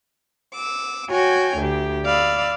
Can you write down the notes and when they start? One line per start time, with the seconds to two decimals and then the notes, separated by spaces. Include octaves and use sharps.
0.54 D6 E6
1.10 F#4 C#5 G5 G#5
1.58 D2 G4
2.06 D5 F5 B5 E6